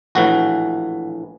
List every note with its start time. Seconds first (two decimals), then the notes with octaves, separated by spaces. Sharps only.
0.15 A#1 A2 E3 F#4